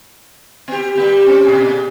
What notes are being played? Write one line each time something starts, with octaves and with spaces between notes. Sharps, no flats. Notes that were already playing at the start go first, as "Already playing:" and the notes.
B3 G4
G3 A#3 G4
C4 C#4
A#2 G#4